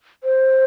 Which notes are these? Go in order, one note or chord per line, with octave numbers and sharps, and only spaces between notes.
C5